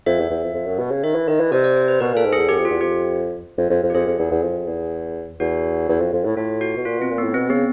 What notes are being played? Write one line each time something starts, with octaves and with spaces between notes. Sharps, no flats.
F2 E5
E2
E2
F2
F2
F#2
B2
C#3
D#3 E5
E3
D#3 D#5
E3
C3 D5
D5
C5
B4
B2 A#4
A#2 A4
G#2
E2 G#4
F#2 G4
F2
F4
E2
F2 G4
F2
F2
F2
G4
F2 G#4
F2
E2
E2
F2
E2
E2 F#4
E2
F2
F2
A2
A2 F4
F#4
B2
A#2 F4
B2 C4
A#2
A2 B3
B2 C4
C#3 B3